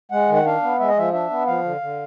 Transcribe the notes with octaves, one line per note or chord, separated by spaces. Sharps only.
G#3 F#5
D#3
F#5
D4 F5
B3
G#3 E5
D#5
F3 E5
D4 E5
B3
F3 F5
D3
D3